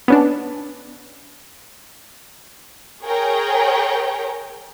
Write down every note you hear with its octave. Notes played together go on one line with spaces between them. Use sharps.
B3 C#4 D4
G#4 A#4 C#5 G5